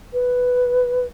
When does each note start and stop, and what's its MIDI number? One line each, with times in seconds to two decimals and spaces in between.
0.13 1.06 71